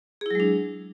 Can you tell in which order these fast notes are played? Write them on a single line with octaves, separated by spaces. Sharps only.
G#4 E4 F#3 G#3 D4